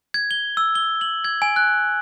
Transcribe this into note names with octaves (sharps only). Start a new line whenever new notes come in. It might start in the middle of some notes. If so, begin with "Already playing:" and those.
G#6
G7
E6
G7
F#7
G#6
G#5
F#6